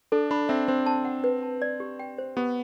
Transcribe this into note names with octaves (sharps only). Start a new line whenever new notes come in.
D4 A4
D4 B5
C4 E5
C4 C5
A5
F#5
B4
A5
D5
G4
G5
C5
B3 G4